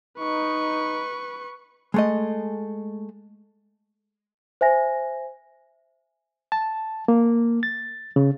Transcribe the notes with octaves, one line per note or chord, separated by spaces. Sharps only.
D#4 B4 C#6
G#3 A3 D#5
C5 E5 G#5 A#6
A5
A#3
A6
C#3